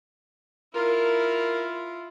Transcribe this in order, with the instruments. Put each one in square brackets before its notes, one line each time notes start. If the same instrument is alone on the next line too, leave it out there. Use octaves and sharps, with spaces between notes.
[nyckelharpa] E4 F4 [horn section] A#4